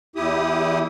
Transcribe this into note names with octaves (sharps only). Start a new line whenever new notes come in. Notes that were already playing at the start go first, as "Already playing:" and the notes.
E2 E4 G4 D#6